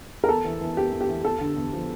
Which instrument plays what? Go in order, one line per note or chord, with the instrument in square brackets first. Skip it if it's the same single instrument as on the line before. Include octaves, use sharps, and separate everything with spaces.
[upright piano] A#4
E2 A4
E3
E3
E2 G4
E2
G4
E3
E2 A4
D3
E2
F3